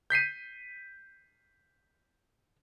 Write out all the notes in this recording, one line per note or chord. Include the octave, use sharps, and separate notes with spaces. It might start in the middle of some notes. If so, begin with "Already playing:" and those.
G6 B6 C7 D#7